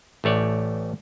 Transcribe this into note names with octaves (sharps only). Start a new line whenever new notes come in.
A1 A3 C#5 D5